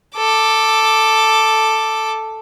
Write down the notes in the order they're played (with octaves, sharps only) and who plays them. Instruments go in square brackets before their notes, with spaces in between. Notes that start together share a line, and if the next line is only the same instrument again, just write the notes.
[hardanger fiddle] A4 D6